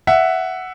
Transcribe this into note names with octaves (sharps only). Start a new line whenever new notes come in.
E5 F#5